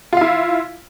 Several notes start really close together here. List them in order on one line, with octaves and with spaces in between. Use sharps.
F4 F5 E4